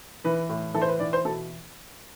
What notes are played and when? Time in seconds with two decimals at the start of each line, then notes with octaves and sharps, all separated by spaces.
0.24 E3 B4
0.49 A2
0.74 E3 A4
0.82 C5
0.88 B4
1.00 E3 D5
1.13 C5
1.25 B2 A4